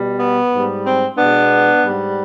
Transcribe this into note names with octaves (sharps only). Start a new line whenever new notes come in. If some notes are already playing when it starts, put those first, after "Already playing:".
Already playing: B2 G3
B3
G#2 G3
C4
B2 G#3 B3 D4
G#2 G3